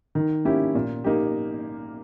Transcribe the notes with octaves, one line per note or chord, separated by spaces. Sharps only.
D#3
A#3 C#4 E4 G4
A#2
A#3 D#4 G4